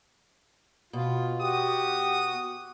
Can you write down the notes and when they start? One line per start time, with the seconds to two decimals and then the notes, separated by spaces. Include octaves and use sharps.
0.93 B2 F4
1.41 F#4 G4 D#6